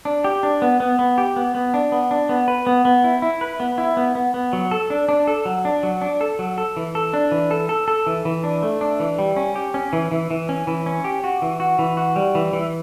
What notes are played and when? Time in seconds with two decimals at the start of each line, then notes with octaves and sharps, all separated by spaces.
0.05 D4
0.24 G4
0.43 D4
0.62 B3
0.80 B3
0.99 B3
1.18 G4
1.36 B3
1.55 B3
1.74 D4
1.92 B3
2.11 D4
2.29 B3
2.48 B4
2.67 B3
2.85 B3
3.04 E4
3.22 E4
3.41 B4
3.60 B3
3.78 E4
3.97 B3
4.15 B3
4.34 B3
4.53 F#3
4.71 A4
4.90 D4
5.09 D4
5.27 A4
5.45 F#3
5.65 D4
5.83 F#3
6.01 D4
6.21 A4
6.39 F#3
6.58 A4
6.77 E3
6.95 A4
7.14 D4
7.32 E3
7.51 A4
7.69 A4
7.88 A4
8.07 E3
8.25 E3
8.44 D4
8.63 A3
8.81 D4
9.00 E3
9.19 G3
9.36 C#4
9.56 G4
9.74 C#4
9.93 E3
10.12 E3
10.31 E3
10.49 C#4
10.67 E3
10.86 C#4
11.04 G4
11.24 F#4
11.42 E3
11.60 F#4
11.79 E3
11.97 F#4
12.16 G3
12.35 E3
12.53 E3